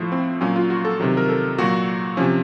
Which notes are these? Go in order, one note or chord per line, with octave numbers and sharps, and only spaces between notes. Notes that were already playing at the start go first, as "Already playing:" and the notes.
Already playing: A2 F3
C4
A#2 F#3 C#4
F4
F#4
A4
C3 D#3 F#3
A#4
A4
A#2 F#3 F#4
C3 F3 C#4